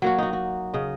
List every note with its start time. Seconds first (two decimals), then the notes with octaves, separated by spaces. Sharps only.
0.02 F#3 A#3 F#4
0.18 D#4 F#4
0.33 F#4
0.74 C#3 D#5